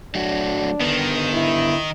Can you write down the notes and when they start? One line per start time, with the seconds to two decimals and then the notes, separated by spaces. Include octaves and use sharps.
0.15 F#3 A3 D4 F#4
0.81 D3 D#3 B3
1.34 E4